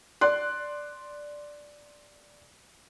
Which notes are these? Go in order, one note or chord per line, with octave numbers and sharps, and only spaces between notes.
D5 C6 F#6